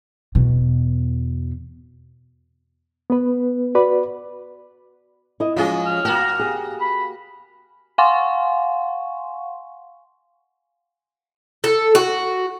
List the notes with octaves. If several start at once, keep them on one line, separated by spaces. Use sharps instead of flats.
E2 B2
B3 B4
F#4 B4 D5 B5
E4 D#5
F3 F#3 G#3 C#4 G#4 D#5
F6
A#3 F#4 G5 A5
G4 G#4
B5
F5 F#5 G#5 C6 C#6
A4
F#4